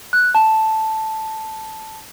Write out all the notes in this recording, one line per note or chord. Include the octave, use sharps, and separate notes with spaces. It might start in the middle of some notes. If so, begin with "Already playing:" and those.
F#6
A5